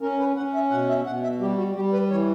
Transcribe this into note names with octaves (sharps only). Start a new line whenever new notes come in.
C#4 A#4
B4
C#4 F#5
E5
B2 F#5
E5
B2 F#5
E5
G3 G4
F#4
G3 G4
B4
E3 C#5